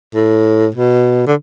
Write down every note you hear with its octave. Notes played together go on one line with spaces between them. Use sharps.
A2
B2
D3